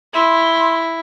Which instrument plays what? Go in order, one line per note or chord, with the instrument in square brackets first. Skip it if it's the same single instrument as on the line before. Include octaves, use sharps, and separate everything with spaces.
[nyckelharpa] E4 [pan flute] C6